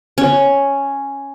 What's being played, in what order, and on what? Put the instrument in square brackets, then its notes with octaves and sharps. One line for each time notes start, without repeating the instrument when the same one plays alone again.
[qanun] C#4